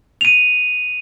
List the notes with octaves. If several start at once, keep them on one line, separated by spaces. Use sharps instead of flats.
D#7 F7